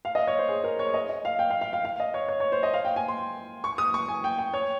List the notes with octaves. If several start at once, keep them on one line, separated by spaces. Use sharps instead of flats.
F5
D#5
C#5
C5
G#4
A#4
C#5
D#5
D#5
F5
G5
F5
F5
F5
F5
D#5
C#5
C#5
C#5
C5
D#5
F5
G5
G#5
C6
C#6
D#6
C#6
G#5
G5
G5
C#5